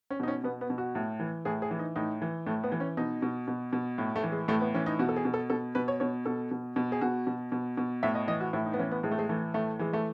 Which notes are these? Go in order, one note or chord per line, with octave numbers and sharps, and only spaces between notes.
C#4
B2 D#4
C#4
B2 B3
B3
B2
F#4
A2
E3
A2 G#4
G#4
E3
D#4
A2 D#4
E3
A2 A3
B3
E3
C#4
B2 D#4
B2
B2
B2
A2
A3
E3
G#3
A2 A3
B3
E3 C#4
D#4
B2 F#4
A4
G#4
B2
A4
B2 A4
B2 B4
C#5
B2 C#5
B2 A4
B2
B2
G#4
B2 F#4
B2
B2
B2
A2 E5
D#5
E3 D#5
F#4
A2 E4
D#4
B3
E3 C#4
B3
A2 G#3
A3
G#3
E3 A3
A2 A3
E3 G#3
A3